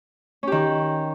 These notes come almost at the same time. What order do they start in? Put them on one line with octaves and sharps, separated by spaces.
C#4 G4 D#3